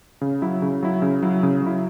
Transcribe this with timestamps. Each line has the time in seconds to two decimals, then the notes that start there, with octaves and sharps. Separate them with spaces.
0.21 C#3
0.42 F#3 E4
0.62 C#3
0.83 F#3 E4
1.02 C#3
1.23 F#3 E4
1.43 C#3
1.62 F#3 E4